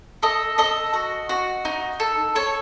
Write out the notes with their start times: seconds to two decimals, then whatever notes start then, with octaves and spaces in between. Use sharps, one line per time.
0.23 A4 D#5
0.58 A4 D#5
0.93 F#4
1.29 F#4
1.65 D#4
2.00 A4
2.35 A4 C#5